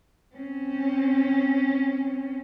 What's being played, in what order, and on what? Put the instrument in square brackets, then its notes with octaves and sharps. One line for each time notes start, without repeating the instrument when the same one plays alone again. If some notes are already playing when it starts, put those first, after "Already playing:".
[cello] C4 C#4